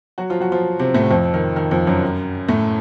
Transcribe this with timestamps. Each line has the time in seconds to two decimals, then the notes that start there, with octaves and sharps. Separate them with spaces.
0.18 F#3 F#4
0.30 F3 F4
0.41 F#3 F#4
0.52 F3 F4
0.79 C3 C4
0.94 A2 A3
1.10 F2 F3
1.34 D#3
1.56 D#3
1.71 F2 F3
1.87 F#2 F#3
2.48 A2 A3